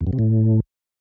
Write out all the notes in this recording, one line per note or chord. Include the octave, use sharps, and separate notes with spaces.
E2
F#2
C3
A2